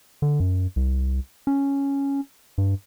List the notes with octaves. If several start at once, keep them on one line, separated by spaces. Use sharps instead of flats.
D3
F#2
C2
C#4
G2